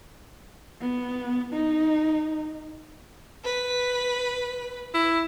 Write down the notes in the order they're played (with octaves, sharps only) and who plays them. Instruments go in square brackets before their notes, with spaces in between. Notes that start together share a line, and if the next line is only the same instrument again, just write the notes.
[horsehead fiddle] B3
D#4
[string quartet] B4
[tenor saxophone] E4